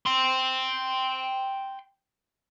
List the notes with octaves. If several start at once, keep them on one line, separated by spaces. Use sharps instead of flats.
G5 C6